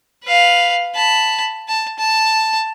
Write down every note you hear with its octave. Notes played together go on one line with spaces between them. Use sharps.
B4 F5
A5 B5
A5
A5